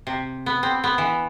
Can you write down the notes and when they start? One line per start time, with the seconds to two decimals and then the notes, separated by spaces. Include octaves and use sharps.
0.07 C3
0.46 B3
0.63 C4
0.84 B3
0.98 E3